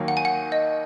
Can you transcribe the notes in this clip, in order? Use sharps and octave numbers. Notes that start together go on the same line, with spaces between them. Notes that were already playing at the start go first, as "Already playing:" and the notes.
Already playing: D#2 D#3 F#3 A#3
F#5
G#5
F#5
D#5